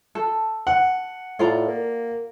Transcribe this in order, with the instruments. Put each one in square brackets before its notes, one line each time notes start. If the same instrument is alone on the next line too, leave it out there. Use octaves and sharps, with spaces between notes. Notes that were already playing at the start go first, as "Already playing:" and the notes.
[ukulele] A4
[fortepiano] F#5
[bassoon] A2 [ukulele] F4 D5 A#5
[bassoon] A#3